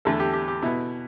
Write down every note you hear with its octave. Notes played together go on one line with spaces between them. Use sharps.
E2 D3 A3 A4
G4
G4
G4
B2 B3 E4